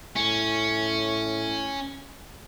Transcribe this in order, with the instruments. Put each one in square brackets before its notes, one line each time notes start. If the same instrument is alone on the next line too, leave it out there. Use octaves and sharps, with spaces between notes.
[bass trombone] A2 [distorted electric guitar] C#4